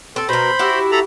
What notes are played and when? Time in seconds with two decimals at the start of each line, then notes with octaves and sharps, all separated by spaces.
0.16 C4 A4
0.29 B2 A#4 C5 B5
0.59 E4 F#4 G4
0.92 A4 A#5 B5